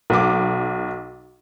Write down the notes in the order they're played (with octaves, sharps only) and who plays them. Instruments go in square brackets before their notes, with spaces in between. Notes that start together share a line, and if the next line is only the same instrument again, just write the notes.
[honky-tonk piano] B1 D6